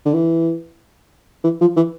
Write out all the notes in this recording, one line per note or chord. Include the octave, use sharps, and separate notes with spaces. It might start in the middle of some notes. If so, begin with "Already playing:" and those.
D3
E3
E3
F3
E3